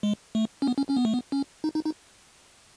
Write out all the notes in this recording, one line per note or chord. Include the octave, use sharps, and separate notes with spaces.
G#3
A3
C#4
B3
C#4
C#4
B3
A3
B3
C#4
D#4
D#4
D#4